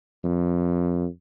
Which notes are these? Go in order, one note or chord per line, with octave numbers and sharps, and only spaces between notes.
F2